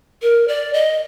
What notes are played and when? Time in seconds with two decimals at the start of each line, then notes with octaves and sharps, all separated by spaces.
0.22 A#4
0.48 D5
0.74 D#5